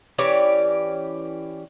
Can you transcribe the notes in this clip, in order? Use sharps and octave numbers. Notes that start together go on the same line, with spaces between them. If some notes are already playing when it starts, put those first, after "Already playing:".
E3 C#4 G4 D5